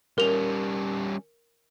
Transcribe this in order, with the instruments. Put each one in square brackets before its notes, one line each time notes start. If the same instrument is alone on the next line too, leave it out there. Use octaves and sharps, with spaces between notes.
[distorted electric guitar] G3 C#4 [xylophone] A#4 F7